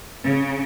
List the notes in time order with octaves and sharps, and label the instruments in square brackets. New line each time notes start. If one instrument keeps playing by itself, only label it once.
[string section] C#3